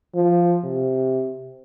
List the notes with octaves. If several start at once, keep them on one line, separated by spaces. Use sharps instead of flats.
F3
C3